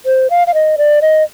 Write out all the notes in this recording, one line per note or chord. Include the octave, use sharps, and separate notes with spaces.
C5
F5
F5
D#5
D5
D#5